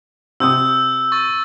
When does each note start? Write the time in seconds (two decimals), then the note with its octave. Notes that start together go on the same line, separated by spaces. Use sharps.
0.40 C3 D#6 E6 G6
1.12 C#6 A6